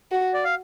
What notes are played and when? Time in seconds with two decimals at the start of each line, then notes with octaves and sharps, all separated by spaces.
0.12 F#4
0.34 D5
0.45 F5